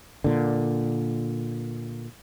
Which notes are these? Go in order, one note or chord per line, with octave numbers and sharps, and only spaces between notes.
A#2 D3